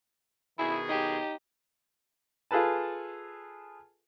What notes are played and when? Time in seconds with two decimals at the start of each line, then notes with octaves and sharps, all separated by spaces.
0.59 B2 D#3 E4 G#4
0.89 D#4 G4
2.51 F4 G#4 A4 B4 A5